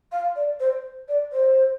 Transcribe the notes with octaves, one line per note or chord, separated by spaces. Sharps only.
F5
D5
C5
D5
C5